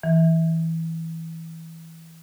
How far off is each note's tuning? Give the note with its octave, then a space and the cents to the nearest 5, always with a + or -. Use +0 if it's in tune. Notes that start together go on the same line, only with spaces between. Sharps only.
E3 -15